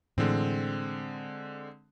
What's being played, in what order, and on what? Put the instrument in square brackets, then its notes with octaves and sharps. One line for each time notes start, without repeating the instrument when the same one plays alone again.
[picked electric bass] A2 E3 [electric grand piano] D3 G#3 C4